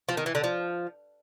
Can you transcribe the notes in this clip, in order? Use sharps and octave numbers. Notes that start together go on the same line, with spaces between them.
F3
D#3
E3
D3
F3